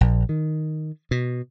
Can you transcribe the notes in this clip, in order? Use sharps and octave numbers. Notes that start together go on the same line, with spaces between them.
A#1
D#3
B2